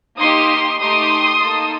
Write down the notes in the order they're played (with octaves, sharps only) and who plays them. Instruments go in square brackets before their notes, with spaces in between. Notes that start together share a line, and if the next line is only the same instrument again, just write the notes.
[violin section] A#3 D#4 G4 C6 D#6
A3 D#4 G4 C6 D#6
A#3 D#4 A4